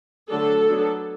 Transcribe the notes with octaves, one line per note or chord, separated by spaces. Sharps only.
D3 F#3 A3 D4 A4
F#3 B3 D4